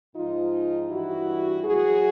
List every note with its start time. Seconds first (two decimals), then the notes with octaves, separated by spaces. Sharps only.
0.15 G#2 F3 D#4 F4
0.89 G2 E3 E4 F#4
1.63 A2 F#3 F#4 G#4